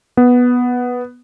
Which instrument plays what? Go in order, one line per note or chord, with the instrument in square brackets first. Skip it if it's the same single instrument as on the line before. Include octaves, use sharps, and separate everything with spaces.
[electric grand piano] B3